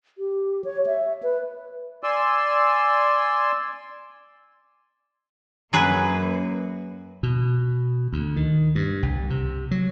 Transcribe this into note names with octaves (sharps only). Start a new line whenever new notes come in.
G4
C#5
E5
B4
D5 G#5 C6 E6
F#2 F#3 A#3 G#4 B4
B2
D2
D#3
G2
C2
C3
F#3